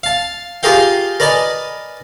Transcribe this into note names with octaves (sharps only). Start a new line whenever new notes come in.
F5 A5
F4 G4 G#4 A#4 F5 G5
A#4 B4 D5 D#5 G#5 A5